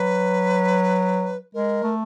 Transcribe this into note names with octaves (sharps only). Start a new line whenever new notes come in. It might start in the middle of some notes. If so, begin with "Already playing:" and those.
Already playing: F#3 B4
G#3 A#4
A3